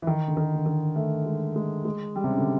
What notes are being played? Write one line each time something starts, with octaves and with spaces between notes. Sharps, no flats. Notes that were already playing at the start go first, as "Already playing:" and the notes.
E3
D#3
D3
D#3
D3
D#3
A3
G#3
G#3
G#3
G3
C3
C#3
D3